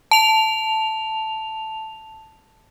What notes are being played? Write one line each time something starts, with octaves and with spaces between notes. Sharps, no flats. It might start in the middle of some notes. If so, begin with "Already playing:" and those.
A5 F7